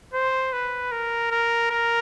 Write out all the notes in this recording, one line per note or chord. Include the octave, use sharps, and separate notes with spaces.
C5
B4
A#4
A#4
A#4